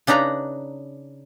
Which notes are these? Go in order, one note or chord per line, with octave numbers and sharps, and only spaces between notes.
C#3 D4 D#4 B4 A#5